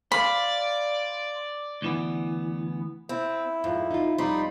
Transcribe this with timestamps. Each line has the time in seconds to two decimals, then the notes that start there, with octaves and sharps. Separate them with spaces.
0.12 C5 D5 F5 B5
1.82 D2 E3 B3
3.09 C4 E4
3.64 F2 G#2
3.91 D#4 F4
4.18 F2 G3 C4 D#4 F4 B5 C6